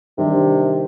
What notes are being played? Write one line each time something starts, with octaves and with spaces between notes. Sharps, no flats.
C3 D#3 G3 D4